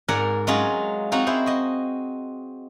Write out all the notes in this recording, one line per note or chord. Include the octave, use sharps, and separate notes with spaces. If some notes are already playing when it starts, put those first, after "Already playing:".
G#2 A#4 D5 F#5 G#5 A#5
F#3 G#3 C#4 F4 G#4
C4 D#4 F4 F#4
E4 G#4 C5
F#4 D#5